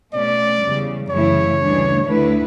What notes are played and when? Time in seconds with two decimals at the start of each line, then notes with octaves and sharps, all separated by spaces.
0.13 B2 A3 C#4 D5
0.62 E2 C#3 G3
1.10 F#2 C#3 E3 A3 E4 C#5
1.59 D2 C#3 E3 G3 D4
2.07 D2 D3 A3 E4 B4